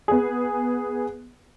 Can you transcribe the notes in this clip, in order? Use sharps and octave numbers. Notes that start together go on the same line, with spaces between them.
B3 G#4